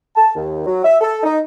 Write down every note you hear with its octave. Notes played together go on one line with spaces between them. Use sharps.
A5
D#2
F#3
E5
A4
D#4